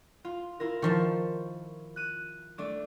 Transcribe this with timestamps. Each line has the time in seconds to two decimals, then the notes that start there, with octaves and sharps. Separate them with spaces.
0.25 F4
0.60 E4 F4 A#4
0.82 D#3 F3 A5 C#6
1.96 F#6 D#7
2.58 A3 D4 D6